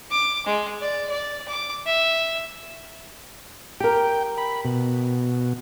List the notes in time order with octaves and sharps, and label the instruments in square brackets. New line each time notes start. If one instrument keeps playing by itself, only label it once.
[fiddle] D6
G#3
D5
D5
D6
E5
[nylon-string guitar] G4 A#4 [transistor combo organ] G5
[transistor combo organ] B5
B2